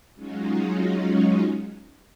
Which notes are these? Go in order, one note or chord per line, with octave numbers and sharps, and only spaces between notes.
F#3 G#3 C#4 D#4 F4 F#4